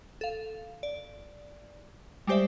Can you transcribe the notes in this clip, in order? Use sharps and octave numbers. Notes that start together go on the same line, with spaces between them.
A4 F5
D5
G3 G#3 G4 C5 D5 E5